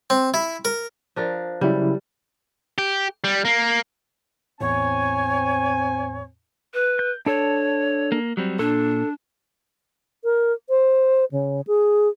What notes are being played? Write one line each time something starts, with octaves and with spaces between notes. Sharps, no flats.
C4
E4
A#4
F3 D4 A#4
C#3 F#3 G3 E4
G4
G3
A#3
E2 A2 C4 C#5 G#5
B4
G6
D4 A4 C#5 A5
A#3
F#3 G3 C4
A#2 D4 A4
A#4
C5
C#3
G#4